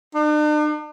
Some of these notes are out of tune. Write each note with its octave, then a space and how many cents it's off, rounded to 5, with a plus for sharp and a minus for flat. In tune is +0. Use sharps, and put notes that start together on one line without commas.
D4 +45